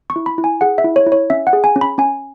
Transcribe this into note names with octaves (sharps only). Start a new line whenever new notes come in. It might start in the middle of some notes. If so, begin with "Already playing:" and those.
C#6
E4
B5
E4
G#5
G#4 F#5
E5
E4
C#5
E4
C#5
C#4 E5
F#5
G#4
G#5
C#4
B5
C#4 G#5